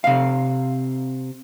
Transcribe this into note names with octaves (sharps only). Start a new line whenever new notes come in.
C3 F5